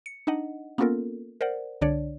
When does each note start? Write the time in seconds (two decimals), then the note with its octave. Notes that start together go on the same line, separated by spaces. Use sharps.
0.06 C#7
0.27 D4 D#4 D#5 F#5
0.78 A#3 B3 C#4 F4 A4 A#4
1.41 A#4 C5 D5 F#5
1.81 C2 D3 D4 C#5 D5